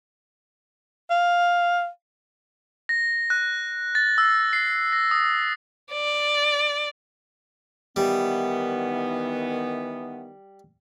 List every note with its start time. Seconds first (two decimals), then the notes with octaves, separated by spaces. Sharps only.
1.10 F5
2.89 A#6
3.30 F#6
3.95 A6
4.18 E6
4.53 C7
4.92 A#6
5.11 D#6
5.92 D5
7.96 D#3 E3 G3 B3